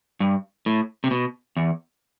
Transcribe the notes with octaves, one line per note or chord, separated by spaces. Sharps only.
G2
A2
C3
B2
E2